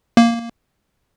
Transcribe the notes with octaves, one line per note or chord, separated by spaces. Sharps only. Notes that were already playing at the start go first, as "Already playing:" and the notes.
A#3